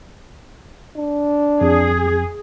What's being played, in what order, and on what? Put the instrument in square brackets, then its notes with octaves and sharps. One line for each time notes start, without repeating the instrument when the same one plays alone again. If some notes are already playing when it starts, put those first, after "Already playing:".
[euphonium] D4
[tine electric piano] F2 [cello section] G#4